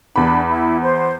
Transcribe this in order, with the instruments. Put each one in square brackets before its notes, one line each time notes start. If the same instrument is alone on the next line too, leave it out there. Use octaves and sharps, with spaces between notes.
[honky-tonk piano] E2 B5 [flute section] D4
[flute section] E4
C5